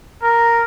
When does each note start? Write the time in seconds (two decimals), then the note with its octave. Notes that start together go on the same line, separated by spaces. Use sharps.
0.22 A#4